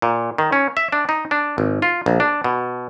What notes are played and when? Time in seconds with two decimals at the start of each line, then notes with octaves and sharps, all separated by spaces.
0.02 A#2
0.38 D#3
0.53 C#4
0.77 E5
0.92 D4
1.09 D#4
1.31 D4
1.58 G#1
1.82 F4
2.06 A#1
2.20 D4
2.44 B2